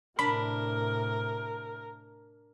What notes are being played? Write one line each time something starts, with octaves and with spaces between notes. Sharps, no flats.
A2 C3 D4 A#4 B5